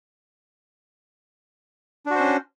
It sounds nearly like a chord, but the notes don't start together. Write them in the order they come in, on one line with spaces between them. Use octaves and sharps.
D4 F#4 C5 C#4